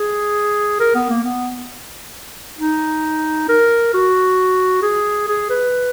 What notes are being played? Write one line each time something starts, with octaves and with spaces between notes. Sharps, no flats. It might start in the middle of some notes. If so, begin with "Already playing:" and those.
Already playing: G#4
A#4
B3
A#3
B3
D#4
A#4
F#4
G#4
G#4
B4